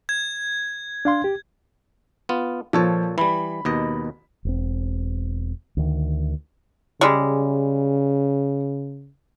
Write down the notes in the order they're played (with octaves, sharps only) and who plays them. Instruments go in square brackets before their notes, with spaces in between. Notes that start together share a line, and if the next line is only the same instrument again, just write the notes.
[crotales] G#6
[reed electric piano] D4 F5 C6
G4
[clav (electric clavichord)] B3 F4
[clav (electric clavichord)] A#2 A4 C#5 [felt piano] F3
[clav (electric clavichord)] E3 G3 [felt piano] B5
[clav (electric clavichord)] D#2 B2 D#5
[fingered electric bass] E1 C4
D2 D#3
[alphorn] C#3 [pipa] G3 G#3